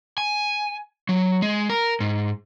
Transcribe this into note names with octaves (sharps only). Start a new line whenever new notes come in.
G#5
F#3
G#3
A#4
G#2